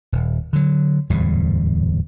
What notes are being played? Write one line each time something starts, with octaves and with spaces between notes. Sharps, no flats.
D#1
D3 F#3
D1 E2 G#2 G3